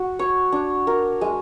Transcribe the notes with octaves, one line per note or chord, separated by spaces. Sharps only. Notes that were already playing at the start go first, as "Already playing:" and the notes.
Already playing: F#4
C#5
D4
A#4
G#3